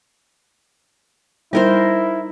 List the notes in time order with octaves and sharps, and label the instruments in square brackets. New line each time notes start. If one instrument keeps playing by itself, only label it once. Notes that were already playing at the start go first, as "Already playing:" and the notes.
[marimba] G3 [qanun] D#4 A#4 C5 [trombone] E4